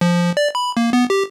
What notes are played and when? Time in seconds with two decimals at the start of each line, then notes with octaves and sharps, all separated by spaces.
0.01 F3
0.37 D5
0.55 B5
0.77 A#3
0.93 B3
1.10 G4